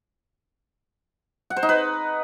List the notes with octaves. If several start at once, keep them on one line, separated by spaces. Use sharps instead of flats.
F#5
C5
D#4
B4